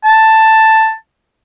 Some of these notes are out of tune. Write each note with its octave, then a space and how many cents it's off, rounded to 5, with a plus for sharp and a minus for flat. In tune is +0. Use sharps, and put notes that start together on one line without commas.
A5 +5